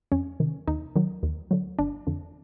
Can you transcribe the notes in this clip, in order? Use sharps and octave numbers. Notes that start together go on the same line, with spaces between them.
F2 C#4
C3 D#3
D#2 D#4
D#3 F#3
D#2
D3 F#3
G1 D4
F2 D3 F3